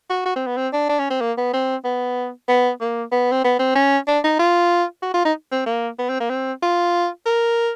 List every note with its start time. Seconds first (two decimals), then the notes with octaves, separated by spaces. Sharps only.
0.10 F#4
0.25 F#4
0.36 C4
0.47 B3
0.57 C4
0.73 D4
0.89 D4
0.99 C#4
1.10 C4
1.21 A#3
1.37 B3
1.53 C4
1.84 B3
2.48 B3
2.81 A#3
3.12 B3
3.32 C4
3.44 B3
3.59 C4
3.75 C#4
4.08 D4
4.24 D#4
4.39 F4
5.03 F#4
5.14 F4
5.25 D#4
5.52 C4
5.66 A#3
5.99 B3
6.09 C4
6.20 A#3
6.30 C4
6.62 F4
7.26 A#4